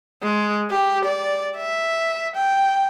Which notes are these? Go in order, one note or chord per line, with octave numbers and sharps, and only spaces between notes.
G#3
G4
D5
E5
G5